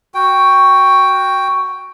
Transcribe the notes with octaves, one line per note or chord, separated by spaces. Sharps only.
F#4 G5